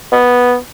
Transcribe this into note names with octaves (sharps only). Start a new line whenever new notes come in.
B3